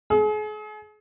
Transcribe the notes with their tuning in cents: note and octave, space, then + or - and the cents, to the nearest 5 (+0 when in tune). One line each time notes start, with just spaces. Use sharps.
G#4 +40